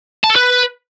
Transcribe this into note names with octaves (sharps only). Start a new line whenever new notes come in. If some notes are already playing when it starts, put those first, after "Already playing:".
A5
A4
B4